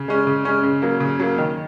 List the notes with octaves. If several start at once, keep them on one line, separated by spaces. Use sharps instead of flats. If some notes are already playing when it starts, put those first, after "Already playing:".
Already playing: C#3
G#3 C#4
C#3
G#3 C#4
C#3
F#3 A#3
C#3
F#3 A#3
D#3